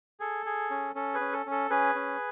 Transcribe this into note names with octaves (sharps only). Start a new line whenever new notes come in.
G#4 A4
G#4
C#4
C#4 A4
G#4 B4
C#4
A4
C#4
A4
C#4 G#4 B4
C#4